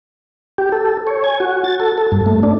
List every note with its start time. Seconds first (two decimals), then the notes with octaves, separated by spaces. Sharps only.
0.58 G4
0.72 A4
1.07 C#5
1.24 G#5
1.40 F#4
1.64 A6
1.80 A4
1.98 A4
2.12 G2
2.26 A3
2.43 D4